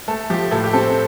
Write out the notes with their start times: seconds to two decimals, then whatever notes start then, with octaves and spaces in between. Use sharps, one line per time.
0.08 A3 A4
0.30 F3 G4
0.51 A2 A4
0.64 G4
0.73 C4 A4
0.89 A4